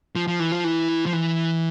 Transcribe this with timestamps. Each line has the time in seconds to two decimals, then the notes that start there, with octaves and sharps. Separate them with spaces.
0.16 F3
0.28 F3
0.40 E3
0.52 F3
0.64 E3
1.06 F3
1.13 E3